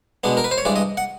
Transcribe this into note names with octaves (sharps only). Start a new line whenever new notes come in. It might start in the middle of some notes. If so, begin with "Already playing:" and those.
B2 G#3 B3 D4
A#4
B4
C5
C#5
G2 E3 G#3 D5
D#5
F#5